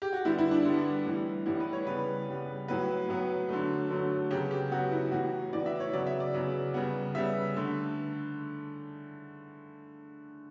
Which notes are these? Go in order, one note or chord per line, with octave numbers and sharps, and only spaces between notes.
G4
F#4
D3 G3 B3 E4
E4
D4
D3 G3 B3
A2 E3 G3 B3
A2 E3 G3 B3 E4
B4
C#5
C#3 G3 B3 B4
C#3 G3 B3
A2 F#3 B3 B4
A2 F#3 B3
D3 F#3 A3
D3 F#3 A3
C#3 F#3 B3 G4
G4
C#3 F#3 B3 F#4
E4
A2 E3 B3 F#4
A2 E3 B3 D5
E5
C#5
C#3 F#3 B3 D5
E5
D5
C#3 F#3 B3
C#3 G3 B3
C#3 G3 B3 E5
D3 A3